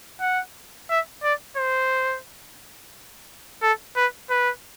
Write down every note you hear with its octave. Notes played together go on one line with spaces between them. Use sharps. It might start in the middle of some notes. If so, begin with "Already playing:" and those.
F#5
E5
D5
C5
A4
B4
B4